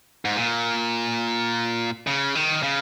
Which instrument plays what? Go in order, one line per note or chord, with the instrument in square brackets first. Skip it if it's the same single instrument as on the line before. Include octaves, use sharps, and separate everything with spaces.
[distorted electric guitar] G#2
A#2
C#3
D#3
C#3